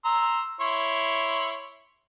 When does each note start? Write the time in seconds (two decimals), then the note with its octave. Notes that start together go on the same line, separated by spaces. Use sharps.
0.05 A#5 C6 E6
0.60 E4 C#5 C6